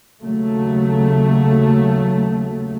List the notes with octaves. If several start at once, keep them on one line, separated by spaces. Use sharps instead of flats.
D#2 C#3 F#3 A3